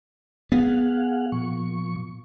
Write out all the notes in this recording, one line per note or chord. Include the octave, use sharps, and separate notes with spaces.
B3 G#4 F5 F#5
A#2 F3 C#6